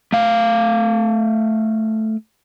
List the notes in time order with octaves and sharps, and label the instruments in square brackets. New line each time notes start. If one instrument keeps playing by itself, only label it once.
[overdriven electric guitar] A3 F5